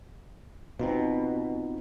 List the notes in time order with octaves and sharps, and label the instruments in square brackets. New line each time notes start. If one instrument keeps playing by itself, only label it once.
[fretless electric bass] B2 [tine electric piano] C4 D#4 F4